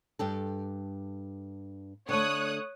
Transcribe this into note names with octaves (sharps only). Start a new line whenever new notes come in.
G2 G4 A4
D3 A3 C#5 D#6 F#6